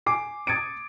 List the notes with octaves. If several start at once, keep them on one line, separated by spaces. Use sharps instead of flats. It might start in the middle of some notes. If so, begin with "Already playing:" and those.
G#5 D6 C7
D#6 G#6 A6 C#7 D7